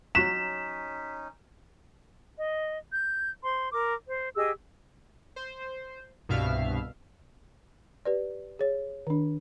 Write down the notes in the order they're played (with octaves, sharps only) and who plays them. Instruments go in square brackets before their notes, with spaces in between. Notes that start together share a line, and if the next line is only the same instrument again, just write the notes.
[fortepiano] F#3 C#6 F#6 [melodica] C#4 D#4 [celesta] B6 [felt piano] E7
[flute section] D#5
G6
C5 C6
A#4 D6
C5
G4 G#4 D#5 E6
[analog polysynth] C5
C2 G2 B2 E5 F5 F6
[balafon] G4 B4 D5
G#4 C#5
D#3 D4